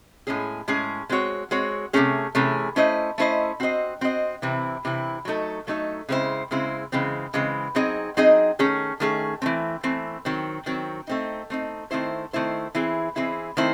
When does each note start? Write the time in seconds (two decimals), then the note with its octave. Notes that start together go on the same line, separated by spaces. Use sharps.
0.27 A2 G#3 C#4 G#4
0.68 A2 G#3 C#4 G#4
1.09 G#3 C4 F#4 C#5
1.51 G#3 C4 F#4 C#5
1.93 C3 E3 A3 C#4 G#4
2.35 C3 E3 A3 C#4 G#4
2.76 A3 C#4 E4 C5 D#5
3.18 A3 C#4 E4 C5 D#5
3.60 C4 F#4 C5 D#5
4.01 C4 F#4 C5 D#5
4.42 C3 E3 C4 E4
4.85 C3 E3 C4 E4
5.25 F#3 A3 D#4 A4
5.67 F#3 A3 D#4 A4
6.09 C#3 G#3 C4 E4 C5
6.51 C#3 G#3 C4 E4 C5
6.92 C#3 E3 G#3 C4
7.34 C#3 E3 G#3 C4
7.75 F#3 C4 D#4 G#4 D#5
8.17 F#3 C4 D#4 G#4 D#5
8.59 D#3 A3 C#4 G#4
9.00 D#3 A3 C#4 G#4
9.42 E3 A3 C4
9.83 E3 A3 C4
10.25 D#3 F#3 C4
10.66 D#3 F#3 C4
11.07 A3 C4 D#4
11.50 A3 C4 D#4
11.91 D#3 A3 C4 E4 C5
12.33 D#3 A3 C4 E4 C5
12.75 E3 C4 E4 G#4
13.16 E3 C4 E4 G#4
13.57 D#3 A3 C4 E4 C5